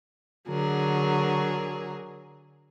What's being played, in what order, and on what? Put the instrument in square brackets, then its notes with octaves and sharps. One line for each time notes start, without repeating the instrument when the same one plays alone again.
[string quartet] D3 F#3 G#4 A#4